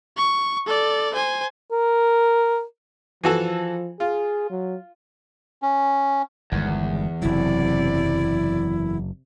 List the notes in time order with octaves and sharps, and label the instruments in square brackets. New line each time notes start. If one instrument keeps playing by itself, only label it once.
[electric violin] C#6
A4 D5
C5 G#5
[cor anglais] A#4
[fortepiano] E3 F#4 A4 [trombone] F3
[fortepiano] F4 [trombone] G#4
[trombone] F#3
[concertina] C#4
[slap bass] G1 D#3 G#3 [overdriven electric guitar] E2
[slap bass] F#1 F#3 [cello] C3 D5 [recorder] E4